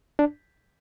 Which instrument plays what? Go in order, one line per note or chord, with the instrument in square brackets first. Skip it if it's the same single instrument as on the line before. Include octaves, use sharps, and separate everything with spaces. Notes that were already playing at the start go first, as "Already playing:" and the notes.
[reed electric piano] D4